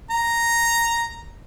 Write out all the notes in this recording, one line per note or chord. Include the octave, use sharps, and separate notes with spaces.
A#5